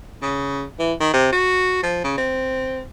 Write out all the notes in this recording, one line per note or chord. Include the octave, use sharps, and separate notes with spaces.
C#3
E3
D#3
C3
F#4
F3
C#3
C4